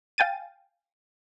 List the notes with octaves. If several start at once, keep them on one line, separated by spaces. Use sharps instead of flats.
F5 G5 G#5 A6 D#7